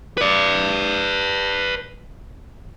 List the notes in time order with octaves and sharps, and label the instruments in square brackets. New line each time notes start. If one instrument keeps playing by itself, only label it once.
[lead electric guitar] B4 D5